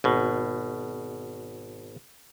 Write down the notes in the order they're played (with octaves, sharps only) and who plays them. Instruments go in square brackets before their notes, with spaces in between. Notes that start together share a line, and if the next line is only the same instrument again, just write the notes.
[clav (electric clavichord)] G#1 B2